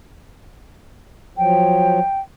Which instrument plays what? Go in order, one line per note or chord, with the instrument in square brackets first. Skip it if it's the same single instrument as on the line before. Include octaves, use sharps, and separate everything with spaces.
[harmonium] F3 F#3 [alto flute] G5